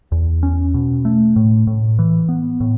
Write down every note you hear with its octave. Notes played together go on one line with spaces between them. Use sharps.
E2
C#4
B2
A3
A2
A2
E3
B3
A2